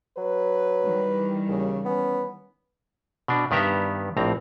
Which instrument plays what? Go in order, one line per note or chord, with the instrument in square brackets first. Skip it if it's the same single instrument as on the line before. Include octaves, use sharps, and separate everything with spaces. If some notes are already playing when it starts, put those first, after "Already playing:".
[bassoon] F#3 [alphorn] B4
[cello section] D#3 E3 G3
[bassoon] D#2 [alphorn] C#3
[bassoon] B3 [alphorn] C#4
[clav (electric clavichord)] B2 D4
G2 D#3 B3 G4 E5 A#5
A#1 A2 C4 A#5